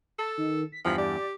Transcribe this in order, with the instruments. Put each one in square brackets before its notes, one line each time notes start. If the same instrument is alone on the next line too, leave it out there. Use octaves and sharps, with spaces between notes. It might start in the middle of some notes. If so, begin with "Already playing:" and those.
[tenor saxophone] A4 [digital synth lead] A5
[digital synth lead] D#3
B6
[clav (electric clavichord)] E2 G2 [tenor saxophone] F3 [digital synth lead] B6
[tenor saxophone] G4 [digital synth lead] D5